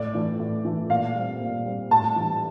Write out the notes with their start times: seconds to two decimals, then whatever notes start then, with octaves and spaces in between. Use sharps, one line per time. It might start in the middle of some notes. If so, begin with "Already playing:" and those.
Already playing: A2 D5
0.14 E3 A3
0.39 A2
0.65 E3 A3
0.90 A#2 F5
1.15 G3 C4
1.40 A#2
1.66 G3 C4
1.91 A2 A5
2.16 E3 G3